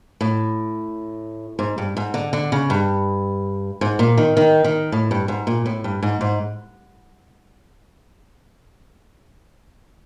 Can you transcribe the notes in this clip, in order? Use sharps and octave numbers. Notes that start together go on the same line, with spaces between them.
A2
G#2
G2
G#2
D3
D3
C#3
G2
G#2
A#2
D#3
D#3
D#3
A2
G2
G#2
A#2
A2
G2
G#2
G#2